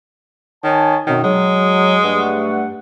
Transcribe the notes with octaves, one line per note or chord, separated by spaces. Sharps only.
D#3 C#5 G#5 A5
F#2 B2 D#3 C4
F#3 G#3
G2 A3 F#5